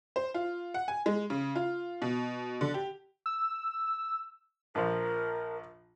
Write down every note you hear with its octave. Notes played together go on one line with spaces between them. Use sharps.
C5
F4
F#5
G#5
G#3
C#3
F4
B2
D3
G4
E6
A#1 F3 A#4